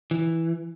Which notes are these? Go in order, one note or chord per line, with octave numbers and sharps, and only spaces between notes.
E3